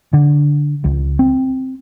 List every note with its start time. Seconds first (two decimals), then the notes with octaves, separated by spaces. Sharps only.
0.13 D3
0.84 C#2
1.19 C4